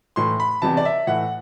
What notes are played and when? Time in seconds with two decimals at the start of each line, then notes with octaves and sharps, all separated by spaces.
0.16 A2 E3 C6
0.40 B5
0.62 E2 C3 E3 A5
0.77 D5
0.85 E5
1.07 A2 E3 F#5